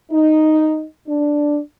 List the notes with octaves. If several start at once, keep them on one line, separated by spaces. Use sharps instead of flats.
D#4
D4